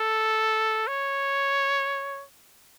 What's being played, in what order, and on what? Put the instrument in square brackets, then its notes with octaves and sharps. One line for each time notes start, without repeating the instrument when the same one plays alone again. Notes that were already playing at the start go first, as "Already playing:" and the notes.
Already playing: [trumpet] A4
C#5